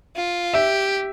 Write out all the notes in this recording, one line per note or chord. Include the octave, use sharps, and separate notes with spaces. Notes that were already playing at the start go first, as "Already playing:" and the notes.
F4
G4 E5